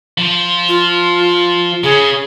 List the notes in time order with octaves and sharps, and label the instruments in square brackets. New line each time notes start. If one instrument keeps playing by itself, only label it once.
[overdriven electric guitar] F3
[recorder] F4
[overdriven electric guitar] C#3 [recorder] G#4